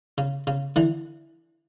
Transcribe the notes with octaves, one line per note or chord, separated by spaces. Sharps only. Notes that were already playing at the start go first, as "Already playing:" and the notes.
C#3
C#3
D3 E3